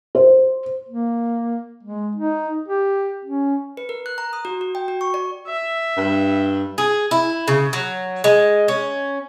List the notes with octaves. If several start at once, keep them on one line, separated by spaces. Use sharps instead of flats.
C5
A#3
G#3
D#4
G4
C#4
B4
A#4
F#6
A#5
D#6
F#4
F#4
G5
F#4
C#6
D5
E5
G2
G#4
E4
C#3
F#3
G#3
C#4